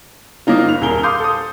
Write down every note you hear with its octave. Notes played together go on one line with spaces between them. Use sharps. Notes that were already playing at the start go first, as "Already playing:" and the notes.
A#3 C#4 D#4 F4
F#1 F7
D#1 G#4 A#4 G7
F5 C6 D6 D#6 G6
A4 D#6